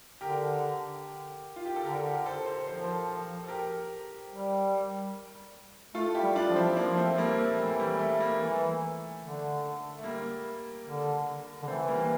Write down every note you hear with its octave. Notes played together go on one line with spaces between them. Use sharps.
D3 G4 A#4
F4
G4
A4
D3 G4 A#4
G4 A#4
A4 C5
A4 C5
F3 C5
A#4
A4 C5
A4
G4 A#4
G3
A3 F4 A4
E4 G4
G3
D4 F4
F3
C4 E4
F3 A#3 D4
A3 C4
G3 A#3
A3
E3 A3
G3
A3
G3 A#3
E3 A3
D3
A3
G3 A#3
D3
D3
E3 A3 C4
G3 A#3
A#3